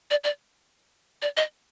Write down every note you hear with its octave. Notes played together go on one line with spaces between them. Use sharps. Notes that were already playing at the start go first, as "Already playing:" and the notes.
D5
D5
D5
D#5